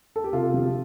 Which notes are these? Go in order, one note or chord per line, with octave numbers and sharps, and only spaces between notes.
A4
G4
C3 F4
F3